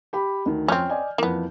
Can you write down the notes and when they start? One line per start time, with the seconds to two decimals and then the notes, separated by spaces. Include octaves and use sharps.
0.13 G4 B5
0.46 D2 D#3
0.68 F2 C4 C#4 F6 G6
0.89 D5 D#5 G#5
1.18 F2 E3 A#3 B3